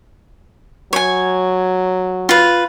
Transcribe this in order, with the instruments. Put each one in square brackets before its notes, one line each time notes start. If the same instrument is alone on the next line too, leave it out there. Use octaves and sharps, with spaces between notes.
[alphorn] F#3 [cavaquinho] C#5 G#5
[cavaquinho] F4 B4